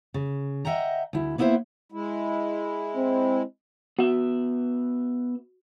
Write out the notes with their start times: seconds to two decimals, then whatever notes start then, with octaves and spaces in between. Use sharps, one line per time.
0.14 C#3
0.65 D#5 E5 F#5 G5 A#5
1.13 D2 E4
1.38 A#3 B3 E4 B4 C5 E5
1.92 G#3 E4
2.96 C4
3.99 B3 F#4 E5